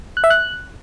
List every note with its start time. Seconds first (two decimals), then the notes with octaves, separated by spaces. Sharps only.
0.17 F#6
0.24 E5
0.30 F#6